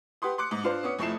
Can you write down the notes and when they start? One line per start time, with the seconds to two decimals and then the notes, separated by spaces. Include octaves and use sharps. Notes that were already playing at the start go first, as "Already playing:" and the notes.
0.22 G4 B4 F#5 C6 D#6
0.38 C6 D6 F#6 C#7
0.51 G#2
0.63 D4 F4 C5
0.83 B3 C#4 D#6 C#7
0.99 F1 F3 A3 E4 C7 E7